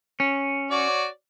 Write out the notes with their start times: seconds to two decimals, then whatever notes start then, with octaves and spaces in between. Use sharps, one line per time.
0.20 C#4
0.71 F#4 C#5 D5